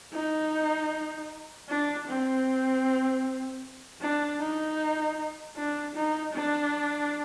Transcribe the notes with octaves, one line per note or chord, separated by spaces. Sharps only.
D#4
D4
C4
D4
D#4
D4
D#4
D4